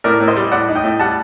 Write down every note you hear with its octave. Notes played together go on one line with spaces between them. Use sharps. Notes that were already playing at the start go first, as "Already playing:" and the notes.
A2 A#4 D5
A2
C5 D#5
G3
A2 D5 F#5
D#4
D#5 G5
A2
G3 F#5 A5